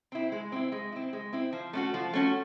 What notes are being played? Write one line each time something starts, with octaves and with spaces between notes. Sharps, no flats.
C4 E4
G#3
C4 E4
G#3
C4 E4
G#3
C4 E4
F3
A3 C#4 F#4
F3
A3 C#4 F#4